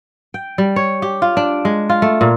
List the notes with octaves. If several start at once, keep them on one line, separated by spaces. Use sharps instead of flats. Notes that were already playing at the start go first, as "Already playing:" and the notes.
G5
G3
C#5
G4
F4
D4
G#3
F4
A3
A#2